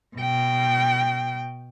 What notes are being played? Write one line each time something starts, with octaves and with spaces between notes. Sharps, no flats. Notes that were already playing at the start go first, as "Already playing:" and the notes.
B2 G5